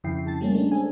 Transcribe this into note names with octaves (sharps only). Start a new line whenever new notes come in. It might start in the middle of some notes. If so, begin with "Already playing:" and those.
F2 C#3 E4 G5 C7
C#3 A5 A6
G3 A3 A#3 C#4
G#3 C#4 D4
C4 G#4 A4 G#5